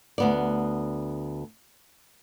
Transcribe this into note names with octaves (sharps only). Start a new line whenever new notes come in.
D2 B3 D5